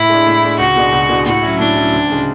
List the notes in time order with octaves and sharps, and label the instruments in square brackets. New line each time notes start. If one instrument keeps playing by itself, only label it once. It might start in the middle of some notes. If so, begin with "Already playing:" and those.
Already playing: [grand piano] A2 [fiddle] E4
[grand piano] G#3 D4
A2
G#3 D4
[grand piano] C#2 [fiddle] F#4
[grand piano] B2 G#3 D4
C#2
B2 G#3 D4
[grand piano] A2 [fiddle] F#4
[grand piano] F#3 C#4 E4
[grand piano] A2 [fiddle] D4
[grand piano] F#3 C#4 E4
D2
C#3 G#3